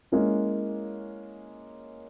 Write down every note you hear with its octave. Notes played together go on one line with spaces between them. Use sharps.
G#3 A#3 C#4 E4